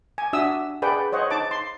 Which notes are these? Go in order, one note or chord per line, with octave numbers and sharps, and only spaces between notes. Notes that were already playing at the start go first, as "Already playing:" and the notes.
G#5
D4 F#4 E5 D#6 E6
G#4 B4 D5 F#5 G5
C5 C#5 D#5 F#5
D#4 A5 D6
C6